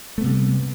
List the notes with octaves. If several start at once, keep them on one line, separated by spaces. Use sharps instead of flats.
C3 G3 A3 B3